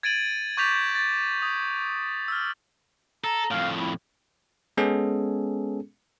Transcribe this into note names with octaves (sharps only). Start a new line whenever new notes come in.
G#6 A6 D7 D#7 F#7
C#6 D6 G6 A6 B6 F7
A6
D#6
E6 F6
A4 A#5
F2 A2 F5
E4
G#3 B3 C#4 G#4 A4